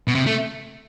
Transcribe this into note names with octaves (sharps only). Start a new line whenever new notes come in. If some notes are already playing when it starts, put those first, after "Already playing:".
B2
C3
A3